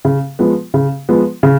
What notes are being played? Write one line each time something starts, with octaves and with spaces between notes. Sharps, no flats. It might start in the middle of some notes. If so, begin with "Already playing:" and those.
C#3
F3 G#3 B3
C#3
F3 G#3 B3
C#3